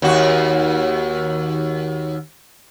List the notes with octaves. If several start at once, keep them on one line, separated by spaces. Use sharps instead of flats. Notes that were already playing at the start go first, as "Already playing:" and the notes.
D#2 F#4